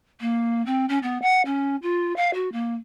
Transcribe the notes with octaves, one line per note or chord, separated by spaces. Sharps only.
A#3
C4
C#4
B3
F#5
C#4
F4
F5
F#4
A#3